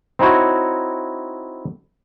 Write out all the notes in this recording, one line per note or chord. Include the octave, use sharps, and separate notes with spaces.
C4 D#4 E4 F#4 C#5